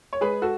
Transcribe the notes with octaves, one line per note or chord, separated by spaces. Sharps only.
C#5
G#3 G#4 B4
F#4 A4